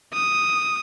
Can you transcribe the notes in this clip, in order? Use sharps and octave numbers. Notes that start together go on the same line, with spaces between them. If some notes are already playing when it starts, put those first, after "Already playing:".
D#6